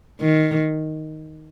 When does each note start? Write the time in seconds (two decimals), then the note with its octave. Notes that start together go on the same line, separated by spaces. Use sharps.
0.21 D#3